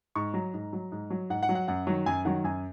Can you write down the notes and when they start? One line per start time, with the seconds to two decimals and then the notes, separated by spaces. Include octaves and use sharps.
0.16 G#2 C#6
0.34 F#3 A#5
0.54 G#2
0.73 F#3
0.92 G#2
1.10 F#3
1.30 G#2 F#5
1.43 F#5
1.49 F#3
1.55 F#5
1.68 F#2 F#5
1.87 D#3 F#3
2.06 F#2 G#5
2.25 D#3 F#3 F#5
2.44 F#2 G#5